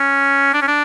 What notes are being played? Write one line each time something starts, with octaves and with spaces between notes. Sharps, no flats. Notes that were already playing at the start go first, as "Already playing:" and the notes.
Already playing: C#4
D4
C#4
D4